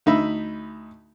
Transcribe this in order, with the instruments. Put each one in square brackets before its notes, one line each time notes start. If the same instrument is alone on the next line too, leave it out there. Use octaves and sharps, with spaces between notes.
[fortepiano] D2 D#4 E5 B5